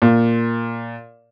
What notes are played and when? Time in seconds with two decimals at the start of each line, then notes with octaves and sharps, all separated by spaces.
0.02 A#2